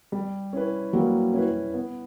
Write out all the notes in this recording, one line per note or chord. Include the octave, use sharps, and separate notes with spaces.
G3
C#4 E4 B4
F#3 G3 A#3
C#4 E4 B4
B3